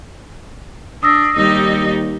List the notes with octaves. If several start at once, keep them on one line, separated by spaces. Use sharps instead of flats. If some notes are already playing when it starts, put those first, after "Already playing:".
D4 D#6 E6 A#6
D#2 G3 D#4